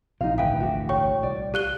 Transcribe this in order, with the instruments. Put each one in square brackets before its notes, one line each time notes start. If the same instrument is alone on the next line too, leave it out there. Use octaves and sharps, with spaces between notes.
[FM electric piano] A#1 [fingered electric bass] C3 [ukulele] D#4 F#4 F5
[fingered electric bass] G#1 D2 E3 [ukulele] B4 G5 G#5 [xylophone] E5 F5
[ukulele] F#4 G4
[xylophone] C#5 G5 C#6
[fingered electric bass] C2 [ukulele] D5
[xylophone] G4 F#6 G7 [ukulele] F5